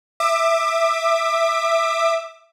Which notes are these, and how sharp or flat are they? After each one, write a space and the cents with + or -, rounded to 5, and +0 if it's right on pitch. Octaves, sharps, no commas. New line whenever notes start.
E5 +0 D6 +30